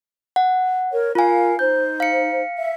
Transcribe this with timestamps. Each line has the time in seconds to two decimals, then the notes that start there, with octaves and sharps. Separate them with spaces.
0.36 F#5
0.91 A#4 C#5
1.15 F4 A#4 F5 G#5
1.59 D#4 C5 G6
2.00 F5 C#7
2.58 E5